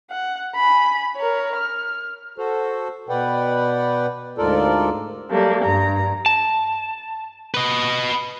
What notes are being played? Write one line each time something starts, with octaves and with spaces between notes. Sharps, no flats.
F#5
G#5 B5
A#4 C#5
F6
F#4 A4 C5
B2 B4 D5 F#5 G5
D2 G#2 F4 A4 A#4 D5
F#3 G3 A3 A#3
G2 A#5
A5
B4 D#5